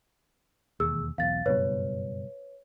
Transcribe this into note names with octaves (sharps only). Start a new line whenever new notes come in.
E1 D#2 G#4 E6
B1 E2 F5 A6
F#1 G2 B2 B4 C#5